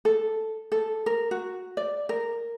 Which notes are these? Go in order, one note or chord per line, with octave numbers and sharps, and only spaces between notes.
A4
A4
A#4
F#4
D5
A#4